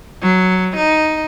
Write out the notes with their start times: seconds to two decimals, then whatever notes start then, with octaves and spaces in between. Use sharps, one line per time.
0.22 F#3
0.77 D#4